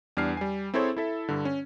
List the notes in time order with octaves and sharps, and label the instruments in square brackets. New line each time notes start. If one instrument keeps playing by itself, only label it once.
[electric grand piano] E2 G3 D4 F6 C7
G3 G#5
C4 E4 G#4 A4 C5 C#5
E4 A4 E5
G2 D3
C#4